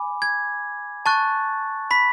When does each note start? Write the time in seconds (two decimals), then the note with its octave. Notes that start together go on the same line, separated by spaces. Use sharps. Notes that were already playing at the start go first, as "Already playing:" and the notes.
Already playing: G#5 B5 D6
0.22 G#6
1.06 A5 C#6 F#6 A6
1.91 B5 B6